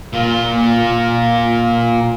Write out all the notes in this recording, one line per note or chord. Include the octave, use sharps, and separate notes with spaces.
A#2 F4